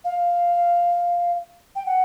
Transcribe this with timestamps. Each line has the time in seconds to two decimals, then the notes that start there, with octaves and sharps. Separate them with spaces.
0.05 F5
1.75 G5
1.86 F#5